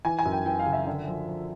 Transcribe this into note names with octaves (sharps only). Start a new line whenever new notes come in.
E3 G#5
G#5
F#2
G5
E3 G5
F5
C#3
E5
D3
F3
F3